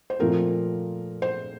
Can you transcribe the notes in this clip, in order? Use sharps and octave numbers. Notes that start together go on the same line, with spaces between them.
C5
A#2 F3 A3 C4 A#4
C5